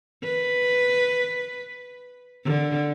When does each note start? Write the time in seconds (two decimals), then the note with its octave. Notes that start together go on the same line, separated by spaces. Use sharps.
0.23 B4
2.44 D3